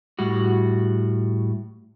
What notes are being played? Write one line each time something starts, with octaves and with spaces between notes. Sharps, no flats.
A2 G3 F#4